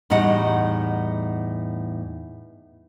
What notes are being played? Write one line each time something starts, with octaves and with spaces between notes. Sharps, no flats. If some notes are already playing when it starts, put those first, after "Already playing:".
E2 A2 G3 D#4 D#5 F#5